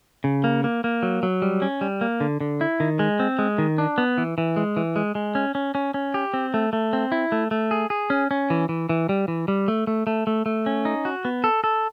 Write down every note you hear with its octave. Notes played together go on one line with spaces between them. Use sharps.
C#3
A#3
A#3
A#3
F#3
F#3
G3
C#4
G3
A#3
D3
D3
E4
D#3
G#3
C4
G#3
D#3
D4
B3
E3
E3
G#3
E3
G#3
G#3
C#4
C#4
C#4
C#4
G4
C4
A3
A3
C4
E4
A3
A3
G#4
G#4
C#4
C#4
E3
E3
E3
G3
E3
G3
A3
A3
A3
A3
A3
C#4
D#4
F#4
B3
A4
A4